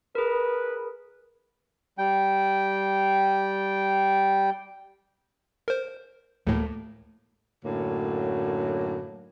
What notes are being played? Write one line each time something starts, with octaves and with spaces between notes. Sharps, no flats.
G#4 A#4 B4
G3 G5
A#4 C5
D2 A2 A3 A#3
F#2 A2 D3 F#3 A#3